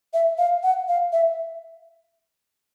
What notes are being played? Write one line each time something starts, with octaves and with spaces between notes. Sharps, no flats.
E5
F5
F#5
F5
E5